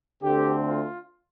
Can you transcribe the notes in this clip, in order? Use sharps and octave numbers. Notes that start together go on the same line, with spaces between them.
D2 D3 A3 C4 G4
F4